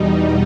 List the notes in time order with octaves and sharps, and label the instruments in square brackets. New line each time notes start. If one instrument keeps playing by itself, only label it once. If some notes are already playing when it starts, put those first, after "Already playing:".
Already playing: [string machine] E2 B2 G3 D#4